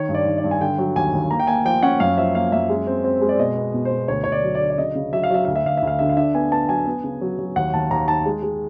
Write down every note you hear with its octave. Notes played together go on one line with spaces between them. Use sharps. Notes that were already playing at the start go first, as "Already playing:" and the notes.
Already playing: D#3 C#5
G2
D5
D#3
D5
G2
G#5
D3 G5
F#3
D#2 G#5
D#2
A#3 A#5
G5
A#3 G#5
F3 G5
C#4 F#5
F#2 F5
F3 E5
A#3 F5
F#2 E5
G#3
C4
C4
G#3
D5
B2 D#5
B3
B2
C5
B2
D2 C#5
D2 C#5
D5
F#3
D5
D3
D5
C#3 D#5
C#3
F#3 E5
F5
F#3 E5
D2 F5
E5
D2 F5
E5
D2 F5
D3 E5
F5
D4 E5
B3 G#5
B3 A5
F#3 G#5
B3
C#3
F#3
F#3
D#2 F#5
D#2 A5
D#2 A#5
D#3 A5
G#3
G#3